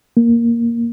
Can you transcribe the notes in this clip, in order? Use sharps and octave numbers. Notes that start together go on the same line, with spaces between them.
A#3